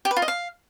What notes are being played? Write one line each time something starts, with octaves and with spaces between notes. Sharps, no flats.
G4
B4
F4
D#5
F5